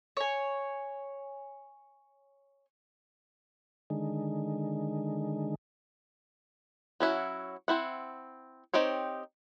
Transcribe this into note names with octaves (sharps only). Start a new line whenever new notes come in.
C#5 G#5
D3 D#3 G#3
F#3 C#4 E4 F#4
C4 E4 F#5
C4 D#4 G4 C#5